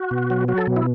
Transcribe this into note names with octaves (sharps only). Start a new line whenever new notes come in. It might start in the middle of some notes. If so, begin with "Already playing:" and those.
Already playing: F#4
B2
F#3
F#3 F#4
A4
B2
E4